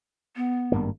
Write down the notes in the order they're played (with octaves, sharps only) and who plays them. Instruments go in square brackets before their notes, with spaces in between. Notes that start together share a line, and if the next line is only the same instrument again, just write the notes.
[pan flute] B3
[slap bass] G#1 G2 A#3